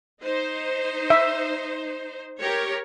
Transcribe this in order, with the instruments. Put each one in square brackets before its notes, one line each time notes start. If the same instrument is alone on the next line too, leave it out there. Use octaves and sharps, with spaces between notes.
[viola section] D#4 C5
[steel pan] E5
[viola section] G4 A#4 C#5